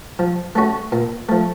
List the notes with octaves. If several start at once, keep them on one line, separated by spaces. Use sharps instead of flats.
F3
A3 C#4 F#4
A#2
F3 A3